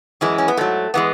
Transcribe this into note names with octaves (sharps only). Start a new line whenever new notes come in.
F#2 E3 G#3 E4
C#4
B3
G#2 F#3 A3
E3 G#3 B3